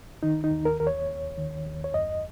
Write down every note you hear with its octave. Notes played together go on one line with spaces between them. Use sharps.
D#3 D#4
D#4
D#2
A#4
D#2 A#4
C#5
D#2
D#3
D#2
C#5
F#2 D#5